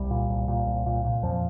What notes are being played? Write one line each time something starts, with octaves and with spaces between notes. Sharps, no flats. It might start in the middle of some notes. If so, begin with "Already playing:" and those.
Already playing: C2 G3
A#2
C2
A#2
C2
A#2
A#2
F2 F3